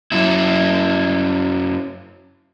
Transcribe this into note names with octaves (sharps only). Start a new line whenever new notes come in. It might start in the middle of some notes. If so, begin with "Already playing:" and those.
F#2 E4